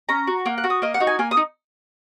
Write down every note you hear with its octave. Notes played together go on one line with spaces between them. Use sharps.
C#4 A#5
F#4
A#3 F#5
F#5
F#4
D#6
A#3 D#5
F#5
D#4 F#4
G#5
A#3 G#5
D#6
D#4